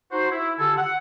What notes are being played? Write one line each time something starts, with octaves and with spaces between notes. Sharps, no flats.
D#4 F#4 C5
E4
D3 F4 G4 A4 G#5 E6
F#5